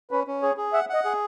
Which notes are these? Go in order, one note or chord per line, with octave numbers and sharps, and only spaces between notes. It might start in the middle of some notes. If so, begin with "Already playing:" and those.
C#4 B4
C#4
G#4 C#5
G#4
E5 F#5
D#5 F#5
G#4